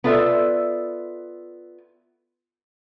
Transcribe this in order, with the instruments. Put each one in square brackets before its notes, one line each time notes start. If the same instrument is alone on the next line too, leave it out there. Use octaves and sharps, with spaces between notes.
[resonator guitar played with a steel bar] B3 F4 A4 D5 E5